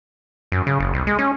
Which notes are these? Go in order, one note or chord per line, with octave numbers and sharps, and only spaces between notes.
F#2
C#3
F#1
C2
G#3
C#4